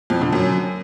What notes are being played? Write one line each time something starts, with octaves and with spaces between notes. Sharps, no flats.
F2
D3
F#2